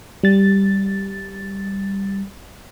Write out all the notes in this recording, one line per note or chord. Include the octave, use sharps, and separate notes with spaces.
G3 A6